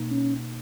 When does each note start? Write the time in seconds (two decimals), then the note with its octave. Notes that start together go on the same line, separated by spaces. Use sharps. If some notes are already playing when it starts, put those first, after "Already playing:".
Already playing: B2 A#3 D#4
0.11 C#4